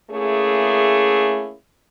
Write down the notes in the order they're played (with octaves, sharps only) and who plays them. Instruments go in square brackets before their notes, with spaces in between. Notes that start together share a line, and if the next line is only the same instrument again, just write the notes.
[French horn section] A3 A#3 C#4 E4 G#4